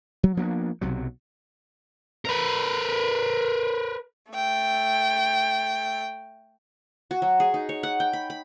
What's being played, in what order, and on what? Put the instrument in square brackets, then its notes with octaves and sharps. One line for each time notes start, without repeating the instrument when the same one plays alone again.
[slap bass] F#3
F3 A#3 B3 D4
B1 C3 F#3
[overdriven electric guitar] A#4 B4
[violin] A3 G5
[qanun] F#4
F#3
G#4
D#4
C#5
F#5
G5
B5
B5